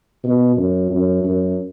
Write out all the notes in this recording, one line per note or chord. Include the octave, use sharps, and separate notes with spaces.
B2
F#2
F#2
F#2